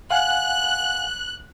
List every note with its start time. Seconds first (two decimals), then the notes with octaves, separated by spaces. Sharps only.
0.11 F5 F#5 G#5 F#6